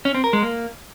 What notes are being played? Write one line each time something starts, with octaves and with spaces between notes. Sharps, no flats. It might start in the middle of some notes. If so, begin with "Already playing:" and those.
C#4
C4
A#4
G#3
A#3